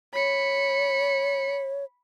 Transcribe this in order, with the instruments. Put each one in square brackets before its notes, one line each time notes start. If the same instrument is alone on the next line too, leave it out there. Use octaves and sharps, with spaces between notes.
[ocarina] C#5 [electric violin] B5 C#7